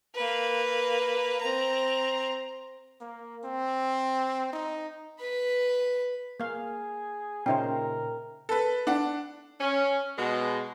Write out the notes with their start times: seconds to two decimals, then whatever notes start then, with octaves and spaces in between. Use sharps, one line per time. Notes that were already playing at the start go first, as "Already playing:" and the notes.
0.15 A#3 B4
1.41 C4 A#5
3.01 A#3
3.44 C4
4.53 D#4
5.20 B4 B5
6.40 A#3 G#4 F5
7.46 A#2 C#3 C#4 D#4 A#4 C5 E5 G5
8.49 A4 B4
8.87 D4 F#5
9.59 C#4
10.17 B2 G#3